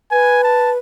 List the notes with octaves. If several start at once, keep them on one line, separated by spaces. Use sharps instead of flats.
B4 G#5
A5